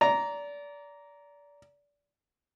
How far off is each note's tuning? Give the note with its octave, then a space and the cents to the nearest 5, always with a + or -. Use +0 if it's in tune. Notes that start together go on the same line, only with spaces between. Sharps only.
D5 -25 A#5 +0